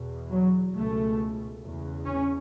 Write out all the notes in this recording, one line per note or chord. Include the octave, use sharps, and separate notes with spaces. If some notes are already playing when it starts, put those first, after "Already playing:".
Already playing: E2 B2
F#3
C#2 B2 A3
E2 C#3
C#4